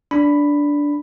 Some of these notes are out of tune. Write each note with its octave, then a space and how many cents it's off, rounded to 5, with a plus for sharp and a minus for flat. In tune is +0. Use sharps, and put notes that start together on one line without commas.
D4 -10 B5 +5